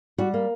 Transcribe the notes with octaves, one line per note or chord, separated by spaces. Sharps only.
G3 F#4
A#3